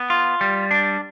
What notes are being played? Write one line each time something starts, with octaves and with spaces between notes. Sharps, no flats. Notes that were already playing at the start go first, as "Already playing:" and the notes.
Already playing: B3
F4
G3
D4